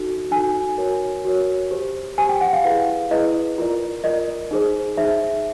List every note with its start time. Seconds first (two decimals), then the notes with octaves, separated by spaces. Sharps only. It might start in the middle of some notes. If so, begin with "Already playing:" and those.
Already playing: D#4 F#4 A4
0.31 D#4 F#4 A4 G#5
0.78 F#4 A#4 C#5
1.25 F#4 A#4 C#5
1.71 G4 C5
2.18 G4 C5 G#5
2.29 G5
2.41 F#5
2.53 F5
2.64 E4 G#4 B4
3.11 E4 G#4 B4 D#5
3.58 F4 A#4 D5
4.04 F4 A#4 D5 D#5
4.51 D#4 G#4 C5
4.97 D#4 G#4 C5 E5